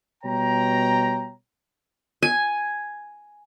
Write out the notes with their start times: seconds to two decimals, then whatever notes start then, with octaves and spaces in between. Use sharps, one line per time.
0.24 B2 G3 C#5 G5 A#5
2.23 G#5